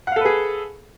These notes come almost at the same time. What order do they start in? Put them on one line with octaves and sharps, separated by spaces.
F#5 F5 A4 B4 G#4